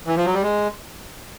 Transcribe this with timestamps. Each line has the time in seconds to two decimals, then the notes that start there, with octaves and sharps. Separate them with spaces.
0.07 E3
0.17 F3
0.26 F#3
0.34 G3
0.43 G#3